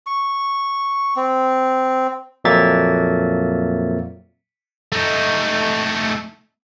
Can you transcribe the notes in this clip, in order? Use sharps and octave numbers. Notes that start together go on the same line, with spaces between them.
C#6
C4
F2 A#2 F#3 A#3 E5 A6
A3 D#4